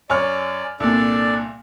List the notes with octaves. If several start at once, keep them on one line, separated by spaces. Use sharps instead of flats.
F#2 C#5 D5 F6
C2 A#2 D4 A4 D5